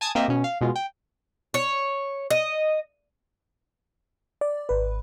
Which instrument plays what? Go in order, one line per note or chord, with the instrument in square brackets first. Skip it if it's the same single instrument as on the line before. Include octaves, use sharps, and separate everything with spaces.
[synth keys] G#5 A5 D#6 G#6
A#3 C4 G4 A#4 D#5 E5
B2 C#4
F5
B2 G#3 F4
G5
[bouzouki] C#5
D#5
[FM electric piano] D5
G#1 B4